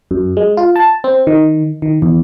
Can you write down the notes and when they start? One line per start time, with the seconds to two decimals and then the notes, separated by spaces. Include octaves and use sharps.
0.11 F#2
0.37 G#3
0.57 F4
0.76 A5
1.04 C4
1.27 D#3
1.82 D#3
2.02 E2